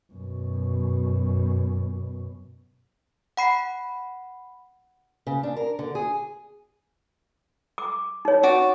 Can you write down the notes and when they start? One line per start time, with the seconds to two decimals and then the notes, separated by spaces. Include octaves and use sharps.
0.13 F#2 B2
3.37 F#5 B5 C7
5.27 C#3
5.43 D4
5.56 A#4
5.79 D3
5.95 G#4
7.78 D6
8.25 D#4 C#5
8.43 F#4 D5